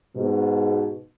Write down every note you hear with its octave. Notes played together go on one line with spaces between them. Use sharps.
G#2 B2